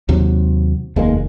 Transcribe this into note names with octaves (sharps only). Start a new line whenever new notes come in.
D#2 C3 F#3
F1 D#2 G#3 A#3